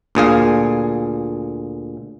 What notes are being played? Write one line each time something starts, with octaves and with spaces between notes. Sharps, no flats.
D2 A#2 G#4 F5